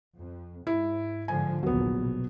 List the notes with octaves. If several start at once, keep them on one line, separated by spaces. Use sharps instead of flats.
F2
G#2 E4
G#2 D3 F3 G#5
F1 A#1 D#2 F#3 B3
B2